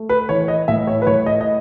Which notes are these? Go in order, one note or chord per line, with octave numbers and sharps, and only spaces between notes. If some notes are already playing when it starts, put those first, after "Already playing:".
Already playing: A3
B4
E3 C#5
D#5
A2 E5
C#5
B4
A2 C#5
D#5
D#5